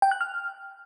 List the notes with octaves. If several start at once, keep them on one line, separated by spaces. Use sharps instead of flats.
G5
F#6
F6